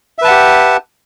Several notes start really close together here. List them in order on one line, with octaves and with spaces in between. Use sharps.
E5 B4 A5 F#5 G4